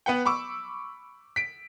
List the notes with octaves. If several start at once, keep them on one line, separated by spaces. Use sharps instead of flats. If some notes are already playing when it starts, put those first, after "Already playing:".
B3 B4 F#5 G5
B5 C#6 D6 E6
B6 D7